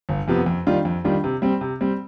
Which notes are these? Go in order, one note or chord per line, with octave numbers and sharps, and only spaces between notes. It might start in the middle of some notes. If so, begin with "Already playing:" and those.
G1
F2 C3 F3 B3
F2
D#3 G3 D4 F4
F2
D#3 G3 D4 F4
C3
G3 C4
C3
G3 C4